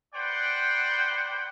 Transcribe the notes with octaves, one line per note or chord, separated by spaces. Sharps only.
B4 C5 D5 F#5 G5